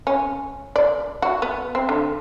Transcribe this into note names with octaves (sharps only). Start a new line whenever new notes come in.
C#4
D5
F#4
B3
C4
D3